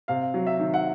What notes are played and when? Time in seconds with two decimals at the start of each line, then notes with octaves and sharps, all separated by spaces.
0.08 C3 F5
0.34 F#3
0.47 E5
0.59 D#3
0.74 F#5